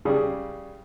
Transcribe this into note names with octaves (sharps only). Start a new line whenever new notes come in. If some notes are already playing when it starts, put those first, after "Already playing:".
C#3 G3 G#4